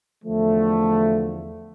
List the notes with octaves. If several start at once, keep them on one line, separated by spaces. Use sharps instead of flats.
E2 D3 F3 A3